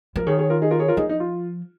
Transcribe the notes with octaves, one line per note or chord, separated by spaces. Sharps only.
F3 A#4
D#3 G#4 C#5
G#4 C#5
F4 A#4
D#4 G#4
F4 A#4
G#4 C#5
F4 A#4
F3 D#4 G#4
D#4
F4